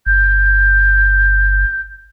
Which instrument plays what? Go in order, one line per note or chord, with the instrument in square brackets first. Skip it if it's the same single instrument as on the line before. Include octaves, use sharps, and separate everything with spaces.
[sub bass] G1 [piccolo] G6